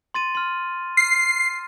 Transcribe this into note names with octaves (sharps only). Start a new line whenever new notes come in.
C6 A6 D#7
C6 F6
F6 C7